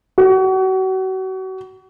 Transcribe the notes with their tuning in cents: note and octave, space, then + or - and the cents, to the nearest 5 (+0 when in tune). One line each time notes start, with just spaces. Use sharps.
F#4 +35